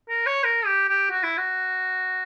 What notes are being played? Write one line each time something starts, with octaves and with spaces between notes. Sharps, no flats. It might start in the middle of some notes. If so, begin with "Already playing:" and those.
A#4
C#5
A#4
G4
G4
F#4
E4
F#4